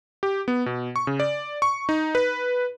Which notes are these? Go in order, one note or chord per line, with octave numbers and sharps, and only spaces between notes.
G4
B3
B2
C#6
C#3
D5
C#6
D#4
B4